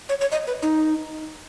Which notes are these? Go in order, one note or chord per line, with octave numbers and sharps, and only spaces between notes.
C#5
C#5
D#5
B4
D#4